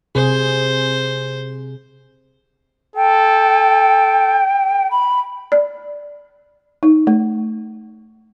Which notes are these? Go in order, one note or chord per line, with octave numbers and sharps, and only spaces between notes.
C3 G#4 C5
A4 G5
B5
D5
D#4
A3